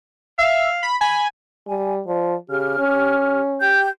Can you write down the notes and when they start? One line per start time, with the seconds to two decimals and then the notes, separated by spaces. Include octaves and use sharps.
0.39 E5 F5
0.83 B5
1.01 G#5 B5
1.67 G3 G#5
2.07 F3 D5
2.49 C#3 G4 F6
2.78 C#4
3.60 G4 G5 G6